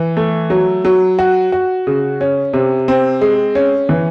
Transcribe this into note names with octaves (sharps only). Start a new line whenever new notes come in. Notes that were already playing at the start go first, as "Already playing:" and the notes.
Already playing: E3
A3
F#3
F#3
F#4
F#4
C#3
C#4
C3
C4
G#3
C#4
E3